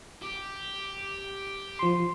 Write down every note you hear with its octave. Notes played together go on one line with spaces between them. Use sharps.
G4
F3 C6